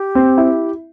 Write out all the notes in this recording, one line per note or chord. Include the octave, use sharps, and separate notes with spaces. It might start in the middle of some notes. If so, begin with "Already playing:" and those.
Already playing: G4
C4
E4